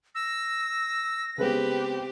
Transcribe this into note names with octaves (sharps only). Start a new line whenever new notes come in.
E6 A#6
C#3 G#3 B3 C4 G4 B4